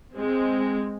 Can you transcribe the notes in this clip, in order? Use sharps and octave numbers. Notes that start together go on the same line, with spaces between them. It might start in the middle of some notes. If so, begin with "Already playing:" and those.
G#3 C4